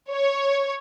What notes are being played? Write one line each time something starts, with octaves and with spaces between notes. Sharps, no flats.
C#5